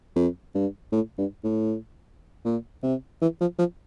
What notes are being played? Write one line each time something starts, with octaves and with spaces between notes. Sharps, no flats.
F2
G2
A2
G2
A2
A#2
C3
E3
F3
F3